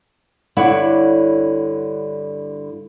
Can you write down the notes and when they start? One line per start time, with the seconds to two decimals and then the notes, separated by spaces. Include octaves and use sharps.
0.57 G2 D3 E4 C#5 D5 F#5